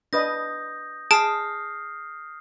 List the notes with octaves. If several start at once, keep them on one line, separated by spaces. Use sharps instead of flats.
D4 B4 D#5 D#6 G6 A#6
G#4 A5 D#6 F6 C7 D7